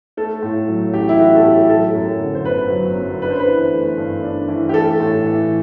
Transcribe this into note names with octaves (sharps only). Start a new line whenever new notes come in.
A3 A4
A2
F#3
A1 G4
E4
A3 F#4
A4
A2 G4
F#3 A4
F#2
D3
C5
G1 B4
F#3
F#2
D4 B4
C5
B4
E3
A3
G2
D4
E3
G4
A3 A4
A2
E3